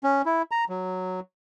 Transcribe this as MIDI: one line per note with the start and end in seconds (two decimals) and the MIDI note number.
0.04 0.22 61
0.26 0.42 64
0.51 0.65 82
0.69 1.20 54